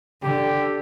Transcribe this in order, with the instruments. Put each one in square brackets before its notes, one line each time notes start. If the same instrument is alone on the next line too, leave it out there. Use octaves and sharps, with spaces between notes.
[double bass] D3 [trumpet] G4